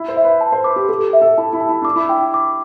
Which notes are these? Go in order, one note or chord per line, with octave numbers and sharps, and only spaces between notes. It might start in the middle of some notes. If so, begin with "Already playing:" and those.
Already playing: E4
C5
E5
B4
A5
C5
B4 D6
G4
G4 A4
E5
A4
E4 A5
E4
A5
E4
D4 D6
E4
G5
D6